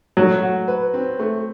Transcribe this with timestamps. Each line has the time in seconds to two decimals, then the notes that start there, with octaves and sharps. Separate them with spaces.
0.17 F#3 A3
0.43 F#4
0.68 B4
0.94 C4
1.19 A3